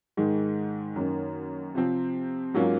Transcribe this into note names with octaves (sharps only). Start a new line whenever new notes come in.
G#2 D#3 G#3
F#2 D#3 A#3 C#4
C3 F3 C4
G#2 F#3 A#3 C#4 F4